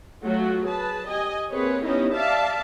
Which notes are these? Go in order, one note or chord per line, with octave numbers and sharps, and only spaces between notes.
F#3 A3 F4 F#4
G#4 B4 A5
G4 D#5 G#5
A#3 C4 G#4 B4 C#5
G3 B3 C#4 D#4 E4
D5 E5 F5 A5